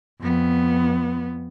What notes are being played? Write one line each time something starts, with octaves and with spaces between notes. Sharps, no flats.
F2 B3